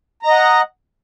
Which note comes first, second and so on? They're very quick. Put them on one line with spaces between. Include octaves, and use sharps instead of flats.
A#5 D#5 F#5